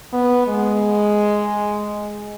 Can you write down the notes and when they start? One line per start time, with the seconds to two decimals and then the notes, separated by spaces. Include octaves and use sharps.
0.13 B3
0.48 G#3